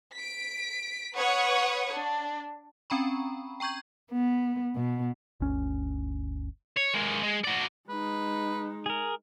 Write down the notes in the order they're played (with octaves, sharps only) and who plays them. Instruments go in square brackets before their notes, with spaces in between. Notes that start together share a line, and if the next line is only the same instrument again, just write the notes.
[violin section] B6 D7
B4 C#5 F#5 C#6 D#6
D4
[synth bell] C4 C#4 G5 A#5 B5 C#6
G5 A#5 C#6 G6 G#6
[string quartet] B3
B2
[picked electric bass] G1 D2 C#4
[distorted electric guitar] C#5
G#3 A#3
G#3
F#4 D5
[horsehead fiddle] G#3 D#4 [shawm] B4
[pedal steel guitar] G#4 A#4